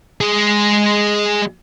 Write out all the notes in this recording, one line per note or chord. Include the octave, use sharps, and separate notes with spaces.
G#3 G#4